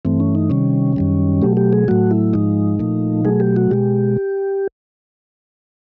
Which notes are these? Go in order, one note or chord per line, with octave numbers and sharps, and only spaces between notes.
G2 E3 A3 C4
C#4
D#4
C3 D#3 G3 C#4
F#2 D#3 G3
B2 F#3 A3 G4
G4
G#4
A2 F#3 A3 F#4
E4
G#2 F3 G#3 D#4
A#2 F3 A3
B2 F#3 A3 G#4
G4
F#4
B2 G#3 G4